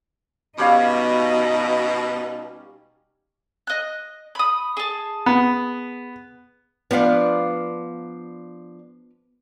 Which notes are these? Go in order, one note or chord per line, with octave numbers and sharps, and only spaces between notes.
B2 G3 C#4 D#4 F5
D#5 F#6
B5 D#6
G#4 A5
B3
F3 B3 D4 F5